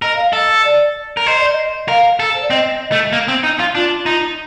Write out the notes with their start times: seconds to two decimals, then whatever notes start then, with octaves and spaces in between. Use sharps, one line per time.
0.02 A#4 D#5
0.16 F5
0.30 A4 D#5
0.64 D5
1.17 A#4
1.26 C5 D#5
1.39 D5
1.52 D#5
1.88 A#4 F5
2.20 A4
2.34 C5
2.42 D5
2.50 C4 D#5
2.92 A3
3.13 A#3
3.28 C4
3.43 D#4
3.60 F4
3.75 D4 F4
4.06 D#4